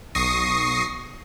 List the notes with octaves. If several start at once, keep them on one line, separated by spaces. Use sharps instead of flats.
B1 C#6 D#6 A#6 C7